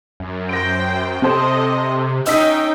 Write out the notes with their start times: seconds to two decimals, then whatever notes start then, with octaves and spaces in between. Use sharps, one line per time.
0.20 F#2
0.49 C5 G5 A#6 D7
1.22 C3 C4 A4 C5 D#5
2.27 C#4 D#4 D#5 G5 E6 B6